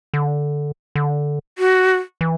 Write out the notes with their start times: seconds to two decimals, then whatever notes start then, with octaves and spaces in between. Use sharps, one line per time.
0.14 D3
0.95 D3
1.58 F#4
2.21 E3